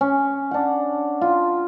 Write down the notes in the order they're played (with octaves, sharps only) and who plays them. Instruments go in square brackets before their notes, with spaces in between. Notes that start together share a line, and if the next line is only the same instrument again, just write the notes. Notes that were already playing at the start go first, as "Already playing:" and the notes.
[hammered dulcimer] C#4
D4 F#5
F4